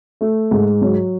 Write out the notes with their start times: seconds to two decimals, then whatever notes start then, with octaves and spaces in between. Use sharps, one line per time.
0.21 A3
0.51 G#2
0.82 F#3